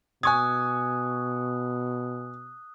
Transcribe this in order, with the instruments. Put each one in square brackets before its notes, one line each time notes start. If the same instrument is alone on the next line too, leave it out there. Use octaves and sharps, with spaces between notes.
[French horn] B2 [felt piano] G#5 C#6 G#6 [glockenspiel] D#6 E6 F#6